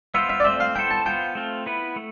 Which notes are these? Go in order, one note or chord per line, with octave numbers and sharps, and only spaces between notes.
B3 F4 C5 E5
E5
D5
A3 C4 F4 C5 E5
F5
B3 E4 A4 C5 G5
A5
B3 F4 C5 G5
A3 C4 F4
B3 E4 B4
A3